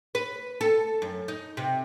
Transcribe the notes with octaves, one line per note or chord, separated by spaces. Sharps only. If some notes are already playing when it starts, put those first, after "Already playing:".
B4
A4
F#2
D#4
C3